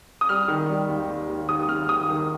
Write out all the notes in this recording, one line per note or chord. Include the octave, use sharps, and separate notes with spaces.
D#6
G3 F6
D#3
G3
D#2
D#2
D#2
D#2 D#6
D#2 F6
D#2 D#6
D#3